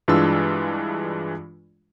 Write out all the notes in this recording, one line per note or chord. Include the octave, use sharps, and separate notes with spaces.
G2 E3 G#3 D4 F4 E6